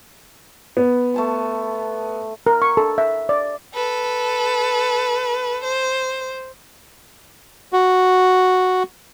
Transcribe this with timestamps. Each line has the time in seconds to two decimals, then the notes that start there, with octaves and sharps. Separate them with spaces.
0.77 B3
1.14 A3 A5 C6
2.47 A#4
2.62 C#6
2.77 A4
2.98 E5
3.29 D5
3.74 A4 B4
5.64 C5
7.73 F#4